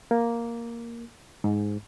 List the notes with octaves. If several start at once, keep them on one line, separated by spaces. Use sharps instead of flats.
A#3
G#2